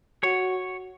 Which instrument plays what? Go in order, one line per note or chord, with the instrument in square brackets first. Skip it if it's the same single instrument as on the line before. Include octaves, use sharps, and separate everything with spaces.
[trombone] F#4 [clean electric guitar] C#5